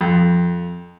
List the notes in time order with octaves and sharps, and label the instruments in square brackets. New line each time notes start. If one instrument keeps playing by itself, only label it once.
[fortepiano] F2